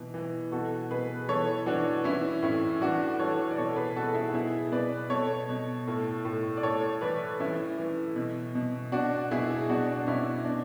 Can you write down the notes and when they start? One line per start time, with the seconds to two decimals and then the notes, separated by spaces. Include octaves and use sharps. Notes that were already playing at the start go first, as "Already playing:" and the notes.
Already playing: B2 E3
0.14 E3
0.52 B2 F#4 A4
0.90 B2 G#4 B4
1.28 E3 A4 C#5
1.66 E3 D4 F#4
2.04 E3 C#4 E4
2.42 A2 C#4 E4
2.81 E3 D4 F#4
3.19 E3 A4 C#5
3.51 D5
3.58 B2 A4 C#5
3.76 G#4 B4
3.96 B2 F#4 A4
4.14 E4 G#4
4.34 B2 E4 G#4
4.72 B2 B4 D5
5.10 B2 A4 C#5
5.49 B2
5.88 A2
6.25 A2
6.57 D5
6.63 A2 A4 C#5
7.01 E3 B4 D5
7.39 E3 C#4 E4
7.78 E3
8.16 B2
8.55 B2
8.92 B2 D4 F#4
9.31 B2 E4 G#4
9.69 B2 D4 F#4
9.95 D4
10.07 B2 C#4 E4
10.45 B2 D4